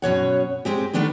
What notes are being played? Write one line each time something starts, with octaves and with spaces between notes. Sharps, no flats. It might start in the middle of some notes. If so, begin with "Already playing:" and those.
F#2 B2 C#5 F#5
G#3 C4 G4
D#3 A3 B3 D4 B4